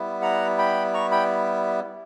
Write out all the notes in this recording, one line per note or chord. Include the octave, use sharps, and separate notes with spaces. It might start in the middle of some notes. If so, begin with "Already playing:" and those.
Already playing: G3 B3 E4
F#5 A#5
G5 B5
A#5 C#6
G5 B5